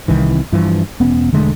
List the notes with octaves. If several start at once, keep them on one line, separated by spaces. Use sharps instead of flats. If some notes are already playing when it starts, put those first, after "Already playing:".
C2 D#3 E3
G2 E3 F3
E1 B3 C#4
E1 D3 G#3 A3